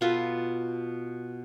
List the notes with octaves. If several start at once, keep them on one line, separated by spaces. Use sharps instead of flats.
B2 F4 A4 B4